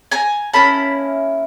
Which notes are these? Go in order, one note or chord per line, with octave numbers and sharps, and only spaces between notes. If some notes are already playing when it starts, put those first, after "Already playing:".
G#5 A#5
A#3 C#4 E4 A5 B5